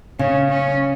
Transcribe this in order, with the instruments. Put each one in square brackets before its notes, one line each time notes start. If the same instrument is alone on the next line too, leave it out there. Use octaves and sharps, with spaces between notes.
[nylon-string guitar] C#3 [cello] C#4
[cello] C#4